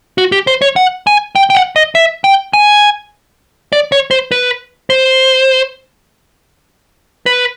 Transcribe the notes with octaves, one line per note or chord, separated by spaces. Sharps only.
F#4
G4
C5
C#5
F#5
G#5
G5
G5
F#5
D#5
E5
G5
G#5
D5
C#5
C5
B4
C5
B4